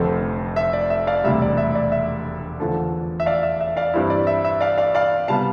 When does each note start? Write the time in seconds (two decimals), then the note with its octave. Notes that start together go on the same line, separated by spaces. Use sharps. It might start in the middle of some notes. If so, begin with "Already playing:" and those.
Already playing: F1 F2 D3 A3 C4
0.56 E5
0.73 D5
0.90 E5
1.07 D5 F5
1.24 E1 D2 C3 G3 E5
1.42 D5
1.57 E5
1.75 D5
1.92 E5
2.60 E2 D3 F3 A3
3.20 E5
3.26 D5 F5
3.43 E5
3.60 E5
3.77 D5 F5
3.94 G2 E3 G3 C4 E4
4.10 D5
4.27 E5
4.45 E5
4.61 D5 F5
4.78 D5 F5
4.95 D5 F5
5.28 C3 G3 B3 F5 A5